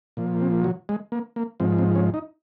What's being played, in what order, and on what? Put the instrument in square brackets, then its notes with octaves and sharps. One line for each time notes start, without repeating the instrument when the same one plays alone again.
[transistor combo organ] A#2 F3
C4
F#3
G#3
A#3
A#3
G#2 F3 C4
C4
C#4
D#4